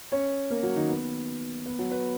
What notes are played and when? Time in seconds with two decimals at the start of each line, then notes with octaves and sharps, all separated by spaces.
0.12 C#4 C#5
0.50 A#3 A#4
0.63 F#3 F#4
0.76 D#3 D#4
0.89 B3
1.66 B3
1.79 F#3 F#4
1.91 B3 B4